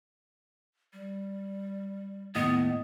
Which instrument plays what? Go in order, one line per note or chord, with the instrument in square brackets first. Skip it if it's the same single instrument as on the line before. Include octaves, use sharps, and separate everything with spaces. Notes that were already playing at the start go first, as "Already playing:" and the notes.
[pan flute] G3
[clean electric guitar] D#2 A2 D#5 [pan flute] B3